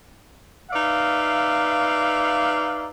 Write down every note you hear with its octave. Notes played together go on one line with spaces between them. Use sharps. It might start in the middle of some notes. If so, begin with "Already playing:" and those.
D#4 B4 D5 E5 F5